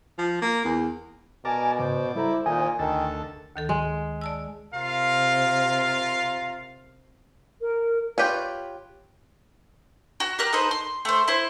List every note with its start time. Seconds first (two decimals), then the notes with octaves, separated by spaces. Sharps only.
0.18 F3
0.42 A#3
0.65 E2
1.45 B2 A#4 D5 G#5 A5
1.79 G#2 C#3 C5 D5
2.15 G3 E4 A4 C5 A#5
2.46 A#2 D#3 D#5 G#5
2.79 D2 D#3 A4 A5
3.56 D2 D#3 A4
3.69 G#3
4.21 D5 A5 E6
4.74 C3 F4 A#4 F5
7.61 A#4
8.18 F4 G4 B4 C#5
10.20 F#4 F#6
10.39 G4 A#4 F#6
10.53 D#4 A4 B4 C5
10.71 C6
11.05 A3 C5
11.28 E4 C5